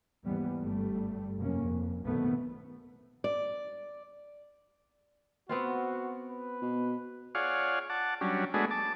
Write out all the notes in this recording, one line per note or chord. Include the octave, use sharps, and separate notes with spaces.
D#2 G#2 E3 G3 B3
G1 G2 G3 A3
F1 F#2 A#3 C#4
F2
A#1 F#2 C3 D#3 A3 B3
D5
B3 C4 F4 F#4
B4
B2
F4 G#4 C#5 D5 F5 F#5
F#5 A5 D6
F#3 G3 C#4 D4
G#3 A3 B3 D4 F#4 G#4
A5 D6